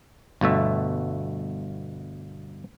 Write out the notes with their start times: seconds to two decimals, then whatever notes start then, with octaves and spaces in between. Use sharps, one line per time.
0.41 G1 B2 A3 E5